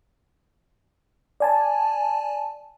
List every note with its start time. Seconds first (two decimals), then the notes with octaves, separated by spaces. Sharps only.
1.40 D5 G#5 A5